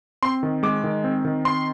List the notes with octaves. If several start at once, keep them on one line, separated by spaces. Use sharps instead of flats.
C4 C6
D#3
G#3 D6
D#3
C4
D#3
C4 C6